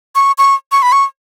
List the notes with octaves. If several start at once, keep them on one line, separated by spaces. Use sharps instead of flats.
C#6
C#6
C#6
B5
C#6